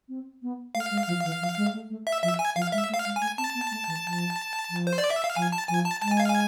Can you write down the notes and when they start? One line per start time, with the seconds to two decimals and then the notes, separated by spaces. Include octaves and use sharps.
0.09 C4
0.42 B3
0.75 A3 F5
0.91 G#3
1.07 F3
1.24 E3
1.41 F3
1.57 G#3
1.73 A3
1.90 A3
2.07 E5
2.23 F3 E5
2.39 G#5
2.55 F3 F5
2.72 G#3 E5
2.89 A3
2.94 F5
3.05 G#3
3.16 G#5
3.21 A3
3.38 C4 A5
3.54 B3
3.71 A3
3.87 E3
4.05 F3
4.70 F3
4.87 C5
4.98 D5
5.10 E5
5.24 F5
5.36 F3 G#5
5.52 A5
5.68 F3 G#5
5.85 A5
6.02 G#3 A5
6.11 G#5
6.20 F5
6.29 G#5